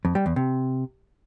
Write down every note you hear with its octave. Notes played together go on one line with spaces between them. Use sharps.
F2
G3
E2
C3